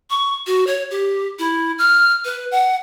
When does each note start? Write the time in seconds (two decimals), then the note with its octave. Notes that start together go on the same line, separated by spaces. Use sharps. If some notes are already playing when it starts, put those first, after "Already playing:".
0.10 C#6
0.47 F#4
0.67 C#5
0.91 G4
1.39 E4
1.78 F6
2.25 B4
2.51 F#5